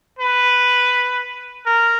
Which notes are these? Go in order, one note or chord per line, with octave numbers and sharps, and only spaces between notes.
B4
A#4